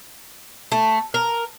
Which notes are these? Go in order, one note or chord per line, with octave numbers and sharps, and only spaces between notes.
A3
A#4